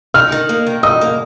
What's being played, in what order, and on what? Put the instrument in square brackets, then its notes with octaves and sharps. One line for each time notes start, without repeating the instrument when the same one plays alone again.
[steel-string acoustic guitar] D#4 [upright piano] F6
[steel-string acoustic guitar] D#3
A#3
D#3
[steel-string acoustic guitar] D#4 [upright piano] D#6
[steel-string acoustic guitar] A#3